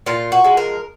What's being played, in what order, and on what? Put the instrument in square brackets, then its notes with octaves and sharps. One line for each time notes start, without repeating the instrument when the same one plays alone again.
[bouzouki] A#2 F4
F#4
F3 G#3
A#4